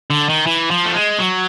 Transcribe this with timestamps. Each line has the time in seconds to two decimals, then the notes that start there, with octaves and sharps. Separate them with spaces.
0.10 D3
0.29 D#3
0.46 E3
0.71 F3
0.86 A3
0.95 G#3
1.19 F#3